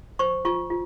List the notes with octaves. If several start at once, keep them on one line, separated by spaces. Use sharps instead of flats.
C5 C#6
F4 C#6
F4